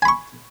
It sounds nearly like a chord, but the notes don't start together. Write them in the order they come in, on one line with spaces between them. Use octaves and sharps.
G#5 B5 C#6